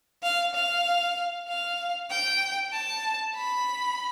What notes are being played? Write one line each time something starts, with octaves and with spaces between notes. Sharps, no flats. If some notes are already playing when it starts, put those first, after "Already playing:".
F5
F5
F5
G5
A5
B5